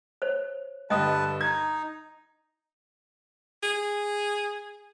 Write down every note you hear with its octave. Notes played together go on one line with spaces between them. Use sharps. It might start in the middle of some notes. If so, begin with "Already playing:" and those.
C5 C#5
G2 D3 G3 B4 D#5 G5 A5 D#6
D#4 G#6
G#4